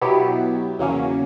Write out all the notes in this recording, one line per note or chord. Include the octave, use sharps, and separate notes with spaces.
B2 F#3 B3 E4 G4
E2 C#3 F#3 A#3 C#4